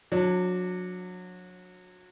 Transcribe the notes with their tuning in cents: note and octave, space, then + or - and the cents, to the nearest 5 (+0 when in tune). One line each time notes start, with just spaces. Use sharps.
F#3 -30 D4 +0